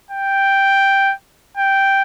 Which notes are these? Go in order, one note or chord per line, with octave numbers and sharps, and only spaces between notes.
G5
G5